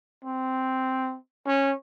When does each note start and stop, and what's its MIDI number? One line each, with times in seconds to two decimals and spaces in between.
0.25 1.17 60
1.46 1.72 61